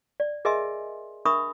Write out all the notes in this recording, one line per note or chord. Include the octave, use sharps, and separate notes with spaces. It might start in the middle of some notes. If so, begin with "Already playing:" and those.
D5
G#4 A#4 D#5 E5 G#5 C6
D4 A#4 E5 B5 C#6 D#6